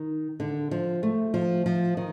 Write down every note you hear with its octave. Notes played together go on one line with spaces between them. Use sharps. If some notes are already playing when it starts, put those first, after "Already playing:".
Already playing: D#3
D3
F3
A3
F3
F3
D#3